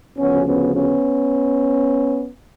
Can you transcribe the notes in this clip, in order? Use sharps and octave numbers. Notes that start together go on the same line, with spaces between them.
D2 C#3 F3 B3 C#4
B3 C#4
B3 C#4